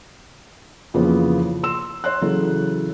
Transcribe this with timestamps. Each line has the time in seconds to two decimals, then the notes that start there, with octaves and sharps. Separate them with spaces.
0.94 F2 C#3 E3 F3 A#3 B3
1.63 C6 E6 E7
2.04 C#5 C6 F#6
2.21 C#3 E3 F#3 A4